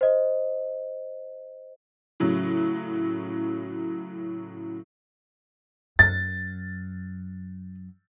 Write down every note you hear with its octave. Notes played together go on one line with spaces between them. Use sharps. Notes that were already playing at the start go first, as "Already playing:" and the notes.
C5 D#5
A2 C#3 F#3
F#2 A6